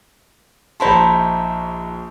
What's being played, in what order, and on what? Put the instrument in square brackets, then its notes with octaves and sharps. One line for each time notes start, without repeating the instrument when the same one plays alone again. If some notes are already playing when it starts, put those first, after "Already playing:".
[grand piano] A#1 C5 C6 [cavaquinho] D#4 E4 A4